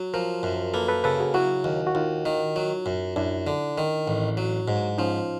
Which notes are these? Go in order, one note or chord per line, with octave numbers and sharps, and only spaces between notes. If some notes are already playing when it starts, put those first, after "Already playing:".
Already playing: F#3
F3 A#4 C5
F#2
A#3 A4 B4
A4 B4
C#3 A4 B4
F#4 G#4
F#3 E4 F#4
D#2
F#4
D#2 D#4 F4
D#3
F#3
F#2
F#2 D4 E4
D3
D#3
A1
F#3
G#2
F3 C#4 D#4